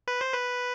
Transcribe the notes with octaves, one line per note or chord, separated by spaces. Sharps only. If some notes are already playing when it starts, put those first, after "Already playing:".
B4
C5
B4